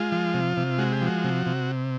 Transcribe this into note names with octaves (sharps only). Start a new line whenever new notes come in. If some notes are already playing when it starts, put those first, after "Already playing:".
Already playing: G#3 F4
F3
C3
C3
G#3 F#4
G4
F3
F#4
C3
C3